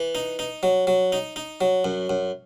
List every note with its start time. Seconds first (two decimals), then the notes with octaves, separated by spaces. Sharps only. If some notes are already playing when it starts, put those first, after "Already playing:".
Already playing: E3
0.15 D#4
0.39 D#4
0.63 F#3
0.87 F#3
1.12 D#4
1.36 D#4
1.61 F#3
1.85 F#2
2.10 F#2